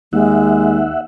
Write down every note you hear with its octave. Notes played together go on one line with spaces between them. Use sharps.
D#2 G#3 E5 F#5